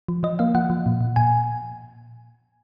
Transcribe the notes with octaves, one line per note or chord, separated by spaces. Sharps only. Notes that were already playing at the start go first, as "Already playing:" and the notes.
F3
F3 D#5
A#3 F5
F3 F#5
F3
A#2
A#2
A#2 G#5